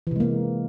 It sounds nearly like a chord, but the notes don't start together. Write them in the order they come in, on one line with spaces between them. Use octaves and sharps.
E3 C3 G#3 A#3